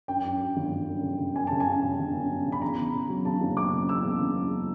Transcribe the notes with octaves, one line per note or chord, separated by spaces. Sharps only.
F#2 G5
F#2
F#2
G1
G1
F#2
C#3
C#3
F#2 G#5
C#3 A5
G#5
F#2
C#3
G1
F#2
F#2
C#3
B5
E2 A#5
E2
C#3
F#3
C#3 A5
F#1
C#3 D6
C#3
E2 E6
C#3
F#1
E2